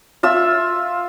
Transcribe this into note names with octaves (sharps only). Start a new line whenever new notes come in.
F4 E5 E6